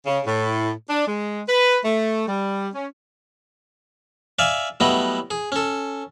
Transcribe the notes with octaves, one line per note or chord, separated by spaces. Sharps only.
C#3
A2
D4
G#3
B4
A3
G3
C#4
D5 E5 F5 G#5
F#3 G3 A3 B3 E4 D#5
G#4
C#4 A4